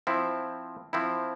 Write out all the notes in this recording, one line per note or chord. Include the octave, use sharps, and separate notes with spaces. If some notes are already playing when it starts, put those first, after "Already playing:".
F3 C4 E4
F3 C4 E4